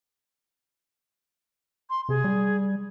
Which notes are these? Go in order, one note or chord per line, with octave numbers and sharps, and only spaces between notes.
C6
C3 G#4
G3